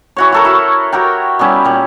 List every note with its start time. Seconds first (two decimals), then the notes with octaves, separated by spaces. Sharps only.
0.17 E3 F#4 C#5
0.32 F#4 A4 A#4
0.45 E4 F#4
0.92 F#4 G4 A#4 G5
1.39 G3 B3 C#4 E4
1.64 A#2 G3